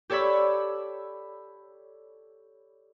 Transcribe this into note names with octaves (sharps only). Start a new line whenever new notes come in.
G4 A4 C#5 D5 B5 E6